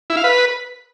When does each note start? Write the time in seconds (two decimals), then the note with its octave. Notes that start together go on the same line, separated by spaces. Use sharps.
0.10 E4
0.17 F5
0.24 B4